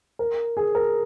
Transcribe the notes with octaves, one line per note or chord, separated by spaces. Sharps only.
A#4
G#4
A#4